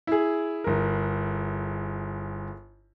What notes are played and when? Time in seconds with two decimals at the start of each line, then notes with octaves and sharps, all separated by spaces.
0.07 E4 G#4
0.64 G1 A#4